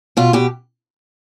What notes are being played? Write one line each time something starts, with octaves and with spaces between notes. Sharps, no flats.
B2 F4
B2 G4